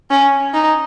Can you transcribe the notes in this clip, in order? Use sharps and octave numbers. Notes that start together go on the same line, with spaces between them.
C#4
D#4